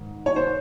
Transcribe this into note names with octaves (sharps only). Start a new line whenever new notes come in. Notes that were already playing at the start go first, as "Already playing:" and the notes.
Already playing: G#2 D#3
C#5
C5